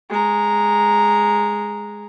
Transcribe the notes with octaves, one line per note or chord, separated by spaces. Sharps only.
G#3 A#5